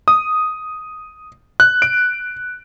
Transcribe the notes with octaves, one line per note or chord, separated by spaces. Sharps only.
D#6
F#6
D7